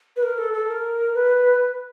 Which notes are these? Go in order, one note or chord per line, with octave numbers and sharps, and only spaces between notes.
B4
A#4
A4
A4
A#4
B4